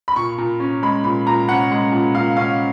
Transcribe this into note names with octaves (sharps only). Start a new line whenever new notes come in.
B5
A#2 C#6
A#2
C#4
G#3 B5
A#2 B5
A#2 A#5
C#4 F#5
G#3
A#2
A#2 F5
C#4 F5